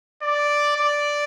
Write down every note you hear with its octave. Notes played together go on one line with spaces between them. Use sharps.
D5
D5